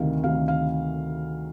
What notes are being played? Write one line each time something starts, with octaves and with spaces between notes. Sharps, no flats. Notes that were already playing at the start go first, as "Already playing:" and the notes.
Already playing: D2 C3 D#3 F5
D2 C3 D#3 F5
F5